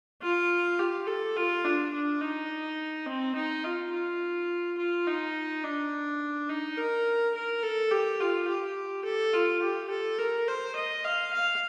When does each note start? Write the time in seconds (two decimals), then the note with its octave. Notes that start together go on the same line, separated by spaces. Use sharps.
0.22 F4
0.79 G4
1.07 A4
1.37 F4
1.65 D4
1.94 D4
2.21 D#4
3.06 C4
3.36 D#4
3.65 F4
3.92 F4
4.78 F4
5.07 D#4
5.64 D4
6.49 D#4
6.78 A#4
7.35 A#4
7.63 A4
7.91 G4
8.20 F4
8.48 G4
9.05 A4
9.34 F4
9.62 G4
9.90 A4
10.19 A#4
10.48 C5
10.76 D#5
11.05 F5
11.33 F5